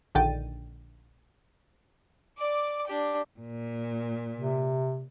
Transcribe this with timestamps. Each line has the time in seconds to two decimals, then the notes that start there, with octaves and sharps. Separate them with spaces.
0.15 A#1 D3 D#3 G5 A6 D#7
2.38 D5 D6
2.87 D4 G4
3.40 A#2
4.37 C3